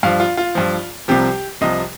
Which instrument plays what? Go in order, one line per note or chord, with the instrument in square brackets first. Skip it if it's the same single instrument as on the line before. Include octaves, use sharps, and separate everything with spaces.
[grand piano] G2 F3 F5
F4
F4
G2 F3
C2 C3 F3 G4
C2 C3 F3 D#5